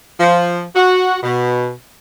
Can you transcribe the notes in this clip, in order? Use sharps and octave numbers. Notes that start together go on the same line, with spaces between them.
F3
F#4
B2